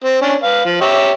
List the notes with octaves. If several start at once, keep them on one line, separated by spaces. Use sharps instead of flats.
C4
C#4 D4
B4 F5
F3
G4 C#5 E5